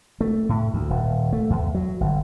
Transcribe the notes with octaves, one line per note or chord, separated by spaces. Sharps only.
A3
A2
D2
D#1
A3
E2
F#3
G1